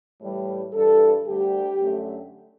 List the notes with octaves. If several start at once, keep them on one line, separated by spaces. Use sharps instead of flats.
A2 E3 G3
G2 E3 G3 A4
D2 D3 G3 G4
F#2 D3 A3